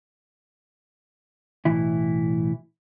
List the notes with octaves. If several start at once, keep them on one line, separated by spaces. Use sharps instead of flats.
B1 A2 E3 E4